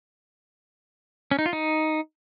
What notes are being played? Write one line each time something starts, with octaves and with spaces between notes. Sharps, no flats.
C#4
D#4
F4
D#4